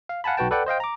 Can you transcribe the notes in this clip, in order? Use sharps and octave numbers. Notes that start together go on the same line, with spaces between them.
F5
F5 F#5 G#5 A5 B5
B1 F#4 B4 G5 A5
A4 B4 D5 F#5 G5
C5 D#5 F5 G5
A#5 D6